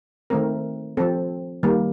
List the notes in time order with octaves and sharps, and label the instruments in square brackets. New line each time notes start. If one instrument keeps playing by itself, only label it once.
[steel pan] D#3 A3 C4 A#4
F3 C4 A4
D#3 G3 A#3